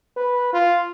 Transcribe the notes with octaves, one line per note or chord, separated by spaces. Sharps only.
B4
F4